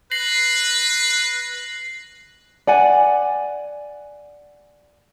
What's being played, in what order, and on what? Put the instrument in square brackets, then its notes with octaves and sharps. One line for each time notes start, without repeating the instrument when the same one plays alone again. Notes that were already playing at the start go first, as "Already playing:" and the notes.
[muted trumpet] B4 [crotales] A#6 C7 F#7
[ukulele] D5 F#5 G#5